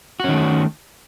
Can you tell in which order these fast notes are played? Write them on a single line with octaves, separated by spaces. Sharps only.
F#4 C#4 D#3 A3